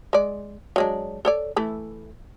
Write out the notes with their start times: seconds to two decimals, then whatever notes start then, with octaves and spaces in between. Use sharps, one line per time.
0.13 G#3 D5
0.76 F#3 G#3 D4
1.25 A4 C#5 D5
1.56 E3 A3 E4